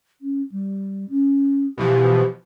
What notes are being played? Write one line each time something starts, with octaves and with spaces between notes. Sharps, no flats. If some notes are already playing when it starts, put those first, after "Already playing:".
C#4
G3
C#4
B2 E3 F3 G4